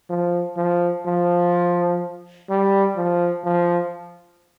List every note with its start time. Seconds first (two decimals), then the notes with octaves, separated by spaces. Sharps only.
0.10 F3
0.57 F3
1.06 F3
2.50 G3
2.97 F3
3.45 F3